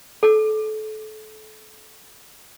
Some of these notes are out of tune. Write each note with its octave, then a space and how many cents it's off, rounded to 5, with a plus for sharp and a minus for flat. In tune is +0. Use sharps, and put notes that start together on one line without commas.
A4 -30